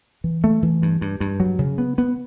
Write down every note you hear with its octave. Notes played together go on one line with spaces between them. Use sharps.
E3
A3
E3
G2
G2
G2
F#3
C#3
B3
B3